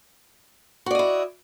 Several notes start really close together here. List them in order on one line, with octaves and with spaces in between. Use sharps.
F#4 D5 D#5 E4